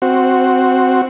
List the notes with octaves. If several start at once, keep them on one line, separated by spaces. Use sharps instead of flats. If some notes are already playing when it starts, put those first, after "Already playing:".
C4 F#4